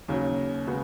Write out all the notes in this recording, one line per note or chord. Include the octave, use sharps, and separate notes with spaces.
D#2 C#3 F#3 C#4
C#3 G#3 B3 F#4